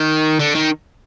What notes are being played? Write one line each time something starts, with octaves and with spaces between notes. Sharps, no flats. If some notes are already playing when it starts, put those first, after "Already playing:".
Already playing: D#3
D3
D#3